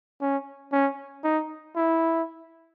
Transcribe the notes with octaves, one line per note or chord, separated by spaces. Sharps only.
C#4
C#4
D#4
E4